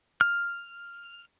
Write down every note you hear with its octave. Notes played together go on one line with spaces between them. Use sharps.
F6